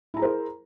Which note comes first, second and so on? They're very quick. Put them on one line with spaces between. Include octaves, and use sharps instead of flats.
E4 A#5 G#4 C5 A#4